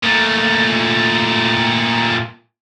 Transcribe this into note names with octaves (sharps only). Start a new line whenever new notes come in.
A#2 A3